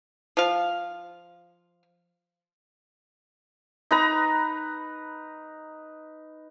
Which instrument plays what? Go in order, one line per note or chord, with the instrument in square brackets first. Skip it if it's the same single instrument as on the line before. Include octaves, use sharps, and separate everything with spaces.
[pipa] F3 F5
[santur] D#4 B4 A#5